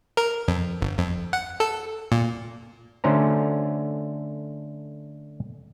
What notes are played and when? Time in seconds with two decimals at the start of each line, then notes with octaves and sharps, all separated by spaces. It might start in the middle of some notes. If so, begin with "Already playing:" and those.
0.17 A#4
0.48 F2
0.81 G1
0.98 F2
1.33 F#5
1.60 A4
2.12 A#2
3.04 D3 A3 C#4 C5 A#5